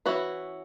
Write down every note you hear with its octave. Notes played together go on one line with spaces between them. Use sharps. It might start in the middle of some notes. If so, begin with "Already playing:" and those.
E3 C#4 E4 F#4 B4